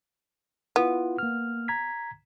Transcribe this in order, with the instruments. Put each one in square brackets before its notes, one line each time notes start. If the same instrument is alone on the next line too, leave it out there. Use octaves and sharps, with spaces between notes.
[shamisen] B3 [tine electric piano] E4 F4
[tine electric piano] A#3 F6
A#5 G#6 B6